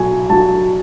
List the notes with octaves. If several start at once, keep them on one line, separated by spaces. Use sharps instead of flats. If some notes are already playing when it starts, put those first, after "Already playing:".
Already playing: B1 F#3 G#5
F#3 A5